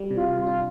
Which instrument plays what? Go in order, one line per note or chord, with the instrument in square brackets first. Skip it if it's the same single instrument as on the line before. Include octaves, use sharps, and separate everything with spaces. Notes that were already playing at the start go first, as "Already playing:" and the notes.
Already playing: [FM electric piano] G3
C3
[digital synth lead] F4
[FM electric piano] C3
[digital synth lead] F4
[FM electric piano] D4